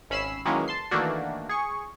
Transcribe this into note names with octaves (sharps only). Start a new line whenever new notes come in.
G#1 C#4 B5 E6 C7 E7
D#3 E3 F#3 G#3 A#3 C#4
A5 C6 C7
D#3 E3 A3 A#3 D4 F#4
G#4 C#6